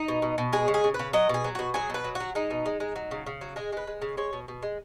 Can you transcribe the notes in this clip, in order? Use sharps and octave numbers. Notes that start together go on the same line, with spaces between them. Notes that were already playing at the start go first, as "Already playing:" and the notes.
Already playing: D#4
B2
B2
B2
G#3 G#4
C#3
G#4
C#3
B4
C#3
F#3 D#5
B2 G#4
F#3
B2 F#4
F#3 G#4
B2 B4
F#3
F#4
F#3
G#3 D#4
B2
G#3
G#3
F#3
C#3
C#3
F#3
G#3 G#4
G#3 B4
G#3
C#3
G#3 C#5
B2
B2
G#3